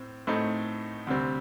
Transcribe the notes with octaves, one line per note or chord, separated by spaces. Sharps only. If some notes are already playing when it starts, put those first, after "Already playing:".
Already playing: A2 C4
A2 A3 C4 D#4
D2 C3 G3 C4